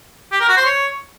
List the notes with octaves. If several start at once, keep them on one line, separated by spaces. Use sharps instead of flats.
G4
A#4
F#4
C5
C#5